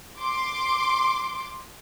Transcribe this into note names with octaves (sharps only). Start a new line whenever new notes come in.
C6 D6